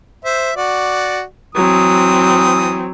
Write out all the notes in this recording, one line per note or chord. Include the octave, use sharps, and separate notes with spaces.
C5 E5
F#4 D5
E3 F#3 C4 D#6